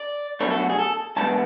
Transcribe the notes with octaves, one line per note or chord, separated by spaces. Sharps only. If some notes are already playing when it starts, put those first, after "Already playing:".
Already playing: D5
B2 F#3 A3 D4 C#5
A4
F#4
G#4
A4
E2 D3 G#3 B3 D4 A5